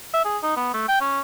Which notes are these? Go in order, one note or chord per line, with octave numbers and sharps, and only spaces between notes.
E5
G#4
D#4
B3
A3
G5
C#4